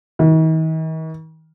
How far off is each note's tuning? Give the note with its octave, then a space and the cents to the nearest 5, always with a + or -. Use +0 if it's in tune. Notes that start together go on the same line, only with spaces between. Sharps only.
D#3 +45